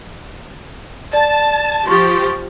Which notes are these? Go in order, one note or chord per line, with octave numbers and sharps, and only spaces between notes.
D5 A5
F3 G4 C6 C#6 A6